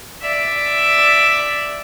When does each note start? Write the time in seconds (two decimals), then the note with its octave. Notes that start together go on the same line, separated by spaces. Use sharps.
0.22 D5 E5